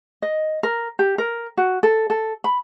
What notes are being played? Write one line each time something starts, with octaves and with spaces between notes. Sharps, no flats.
D#5
A#4
G4
A#4
F#4
A4
A4
B5